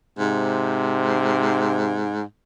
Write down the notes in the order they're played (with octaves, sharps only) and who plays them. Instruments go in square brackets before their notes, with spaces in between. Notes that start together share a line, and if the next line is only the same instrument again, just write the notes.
[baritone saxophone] G#2 [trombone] C3